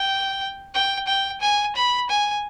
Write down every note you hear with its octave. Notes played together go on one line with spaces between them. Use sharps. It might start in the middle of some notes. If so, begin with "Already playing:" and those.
Already playing: G5
G5
G5
G#5
B5
G#5